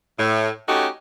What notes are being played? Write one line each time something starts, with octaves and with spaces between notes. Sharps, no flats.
A2
A3 C#4 D#4 F#4 G4